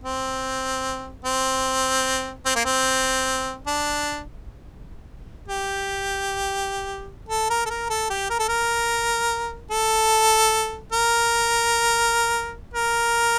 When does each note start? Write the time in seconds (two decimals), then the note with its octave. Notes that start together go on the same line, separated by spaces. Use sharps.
0.04 C4
1.25 C4
2.46 C4
2.56 A#3
2.65 C4
3.67 D4
5.48 G4
7.29 A4
7.50 A#4
7.66 A4
7.70 A#4
7.90 A4
8.10 G4
8.30 A#4
8.39 A4
8.48 A#4
9.71 A4
10.92 A#4
12.74 A#4